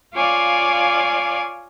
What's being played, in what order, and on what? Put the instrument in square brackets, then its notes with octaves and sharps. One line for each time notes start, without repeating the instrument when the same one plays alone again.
[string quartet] F4 C#5 D5 F5 G#5 D6